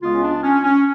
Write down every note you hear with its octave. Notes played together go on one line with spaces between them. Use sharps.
C#2 C#3 G#3 B3 F4
C#4
D4
C#4
C#4